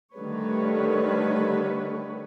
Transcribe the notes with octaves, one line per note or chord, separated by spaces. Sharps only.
D3 D#3 G3 A3 B4 C#5